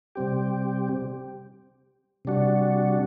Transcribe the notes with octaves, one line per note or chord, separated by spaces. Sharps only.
C3 G3 C4 G4
C3 G3 D4 F#4